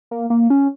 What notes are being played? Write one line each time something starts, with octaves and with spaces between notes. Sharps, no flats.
A#3
A#3
C#4